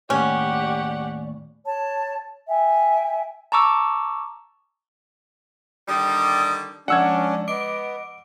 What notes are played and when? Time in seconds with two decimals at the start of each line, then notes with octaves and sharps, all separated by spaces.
0.10 D#2 A2 C#4 G4 D5 F#5
1.64 C#5 A5
2.48 E5 G5 G#5
3.52 A5 A#5 C#6 D6 E6
5.88 D3 D#3 G3 D#6
6.88 F3 G#3 C#4 D4 D5 F#5 E6 G#6
7.48 B3 D#5 D6 D7